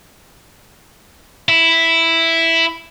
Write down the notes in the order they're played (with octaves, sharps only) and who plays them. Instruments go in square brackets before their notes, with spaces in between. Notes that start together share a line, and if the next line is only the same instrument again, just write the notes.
[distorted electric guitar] E4